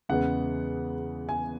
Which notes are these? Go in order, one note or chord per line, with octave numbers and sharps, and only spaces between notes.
E2 C#3 G#3 B3 F#5
G#5